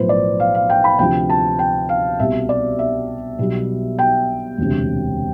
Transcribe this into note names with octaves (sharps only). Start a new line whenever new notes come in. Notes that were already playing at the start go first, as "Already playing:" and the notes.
Already playing: B1 A2 F3 B4 C5
D5
F5
F5
G5
B5
D2 C3 F3 G5
A5
G5
F5
C2 B2 G3 E5
D5
E5
B1 B2 G3
G5
E1 D2 C3